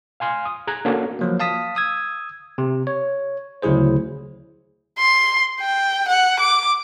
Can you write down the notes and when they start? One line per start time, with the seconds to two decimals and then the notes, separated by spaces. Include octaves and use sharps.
0.20 F5 G#5 C6 F6
0.45 D#6
0.67 G#4 A#5 F#6 G#6
0.85 A#3 C#4 D4 F#4 A4 F5
1.19 F3 F#3 A#3
1.40 F5 A5 D#6 B6
1.76 D#6 E6 G#6
2.58 C3
2.87 C#5
3.62 D2 C#3 F#3 E4 G#4 C5
4.98 C6
5.61 G5
6.08 F#5
6.40 D6